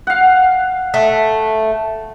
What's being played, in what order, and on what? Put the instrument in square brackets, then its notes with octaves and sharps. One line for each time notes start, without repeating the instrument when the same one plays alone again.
[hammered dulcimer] F5 F#5
[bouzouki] A3